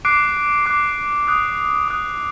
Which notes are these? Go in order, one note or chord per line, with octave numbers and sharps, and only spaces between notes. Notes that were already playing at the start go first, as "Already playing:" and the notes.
D6 F#6 C7 D7
D6 F#6
D#6 F#6
D#6 F#6